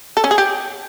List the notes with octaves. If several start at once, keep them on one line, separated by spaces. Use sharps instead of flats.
A4
C#4
G#4
G4